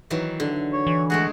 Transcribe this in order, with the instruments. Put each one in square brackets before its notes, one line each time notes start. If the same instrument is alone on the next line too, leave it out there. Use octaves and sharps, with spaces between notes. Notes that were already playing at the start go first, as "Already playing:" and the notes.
[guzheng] D#3 E3 F#3
D3
[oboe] C#5
[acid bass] E3
[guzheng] G#3 A3 G#4 [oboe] F#4